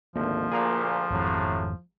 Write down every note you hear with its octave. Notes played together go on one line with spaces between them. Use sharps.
G#1 D2 F3 A#3
D2 A#2 G#4 A#4 F5
G#1 F2 A2 C3 F#3